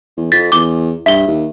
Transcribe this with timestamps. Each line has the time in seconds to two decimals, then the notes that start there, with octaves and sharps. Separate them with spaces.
0.17 E2
0.32 F2 A6 B6
0.52 E2 D6 G7
1.06 G2 E5 G7
1.27 D#2